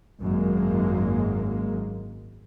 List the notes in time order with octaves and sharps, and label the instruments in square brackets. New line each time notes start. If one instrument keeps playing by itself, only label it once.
[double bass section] G#1 F#2 G#3 A#3